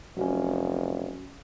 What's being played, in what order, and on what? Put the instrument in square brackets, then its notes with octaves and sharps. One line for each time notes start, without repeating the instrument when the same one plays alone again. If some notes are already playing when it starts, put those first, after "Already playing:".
[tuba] F1 [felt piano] F#3 C#4